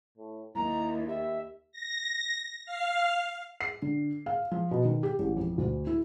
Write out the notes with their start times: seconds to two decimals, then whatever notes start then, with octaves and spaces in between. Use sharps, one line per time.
0.18 A2
0.55 D#2 E4 A#5
1.08 G4 E5
1.72 A#6
2.66 F5
3.61 C7
3.82 D3
4.26 F5
4.51 F3
4.71 B2
4.85 D#3
5.03 G4
5.19 A1
5.37 F2
5.58 D2
5.87 E4